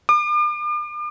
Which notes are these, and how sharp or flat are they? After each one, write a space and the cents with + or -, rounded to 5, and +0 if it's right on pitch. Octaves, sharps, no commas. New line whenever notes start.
D6 +40